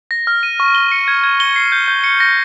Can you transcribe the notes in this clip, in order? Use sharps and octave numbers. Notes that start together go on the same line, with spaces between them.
A#6
F6
D#7
C#6
G7
C#7
G#6
G#6
G7
C7
G6
G6
C#7
A#6